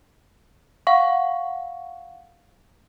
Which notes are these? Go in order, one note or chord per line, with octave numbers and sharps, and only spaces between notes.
F5 F#5 C#6